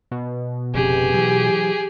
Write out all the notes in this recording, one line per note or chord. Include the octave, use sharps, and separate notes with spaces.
B2
F1 F2 C#3 G4 G#4
E3 F#3